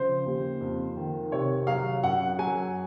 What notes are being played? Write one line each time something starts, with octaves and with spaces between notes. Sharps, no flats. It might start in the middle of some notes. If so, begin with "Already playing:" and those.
Already playing: C#3 F3 C5
D#2
F2
D#3
C3 C#5
F#3 F5
F#2 F#5
F#3 G#5